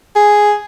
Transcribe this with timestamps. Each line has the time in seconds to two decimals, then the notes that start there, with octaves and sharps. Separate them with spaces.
0.16 G#4